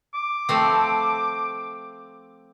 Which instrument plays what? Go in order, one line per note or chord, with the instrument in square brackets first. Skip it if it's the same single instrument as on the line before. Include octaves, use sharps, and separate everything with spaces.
[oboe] D6
[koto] F3 A3 C4